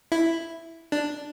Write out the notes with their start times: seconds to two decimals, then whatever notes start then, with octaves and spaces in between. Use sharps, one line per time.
0.12 E4
0.92 D4